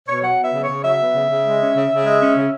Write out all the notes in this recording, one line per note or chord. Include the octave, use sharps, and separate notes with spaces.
B2 C#5
F#3 F#5
B3
E5
C#3
C#5
C#3
F#3 E5
B3
C#3
C#3
G#3
C#4
C#3
C#3
G#3
C#4
C#3